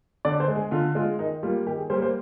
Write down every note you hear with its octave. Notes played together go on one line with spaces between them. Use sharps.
D3 D5
C5
G#3
G#4
D3 F4
G#3 F4
D#3 D#4
G3 A#3 F4
D#3 G4
G#4
G3 A#3 C5
C5